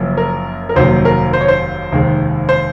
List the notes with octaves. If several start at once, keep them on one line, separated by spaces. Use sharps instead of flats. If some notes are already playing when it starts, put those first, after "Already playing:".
Already playing: F#1 F#2 F3 A#3
A#4
A#4
F1 D#2 D#3 F#3 A#3 C5
A#4
C5
C#5
C5
F1 D#2 D#3 G#3
C5